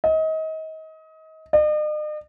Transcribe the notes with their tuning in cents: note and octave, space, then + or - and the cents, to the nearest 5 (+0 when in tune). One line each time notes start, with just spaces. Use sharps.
D#5 +30
D#5 -45